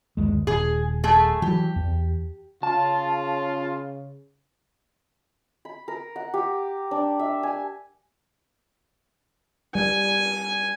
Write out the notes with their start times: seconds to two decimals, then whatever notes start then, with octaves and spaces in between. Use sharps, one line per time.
0.17 G1 D#2 G#3
0.47 D#1 G#4
1.04 A3 G#4
1.42 E3 F#3 G4
1.76 E2
2.63 C#3 F4 A5
5.65 B5
5.88 A#4
6.16 F#5
6.34 G4
6.91 D4
7.19 E5
7.43 G#5
9.75 G3 G#5